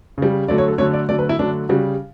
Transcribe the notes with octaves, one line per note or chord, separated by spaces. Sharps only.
C#3 G3
D3 F#3 A3 D5
C#5
A4
D3 F#3 A3 C#5
D5
D3 F#3 A3 D5
B4
E4
D3 F#3 A3 D4
C#3 G3 F#4